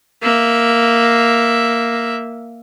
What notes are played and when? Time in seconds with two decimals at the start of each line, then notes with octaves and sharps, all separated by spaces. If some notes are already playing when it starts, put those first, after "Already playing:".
0.22 A#3 E5